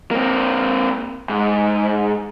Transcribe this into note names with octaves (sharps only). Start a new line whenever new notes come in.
A#3 C4
G#2